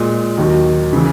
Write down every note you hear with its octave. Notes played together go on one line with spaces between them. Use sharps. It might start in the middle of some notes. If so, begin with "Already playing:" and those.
Already playing: A#2 G#3
D#2 D#3 F#3
C#3 E3